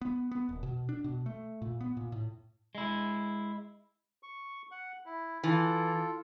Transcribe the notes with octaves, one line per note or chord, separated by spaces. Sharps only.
B3
B3
D#1
B2
D4
B2
A3
A#2
B3
A#2
A2
G#3 E4
C#6
F#5
E4
E3 F4 A4